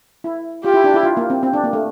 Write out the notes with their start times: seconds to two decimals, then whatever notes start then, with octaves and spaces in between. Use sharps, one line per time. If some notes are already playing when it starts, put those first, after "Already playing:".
0.24 E4
0.64 F4 G4
0.74 E4
0.84 D4
0.94 E4
1.03 F4
1.17 A#3
1.30 C4
1.43 C4
1.53 D4
1.64 A#3
1.73 A3